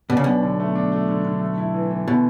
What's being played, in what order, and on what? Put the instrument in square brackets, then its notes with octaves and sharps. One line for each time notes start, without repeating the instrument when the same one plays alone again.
[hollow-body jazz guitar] B2 [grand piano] D4
[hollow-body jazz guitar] C#3
[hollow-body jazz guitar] B1 B2 [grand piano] D4
[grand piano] D3
A3
D4
A3
D3
D3
A3
E4
E3
E3
[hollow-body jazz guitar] B2 [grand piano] E3